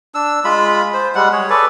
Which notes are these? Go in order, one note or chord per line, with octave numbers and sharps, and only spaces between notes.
D4 E6
G#3 F4 B5
C5
G3 G#3 F#5
G#4 C#5
A4 B4 D5